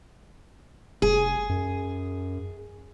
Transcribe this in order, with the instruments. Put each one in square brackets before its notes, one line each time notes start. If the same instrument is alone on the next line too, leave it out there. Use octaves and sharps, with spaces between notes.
[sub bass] F1 [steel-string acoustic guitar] G#4
[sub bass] F#2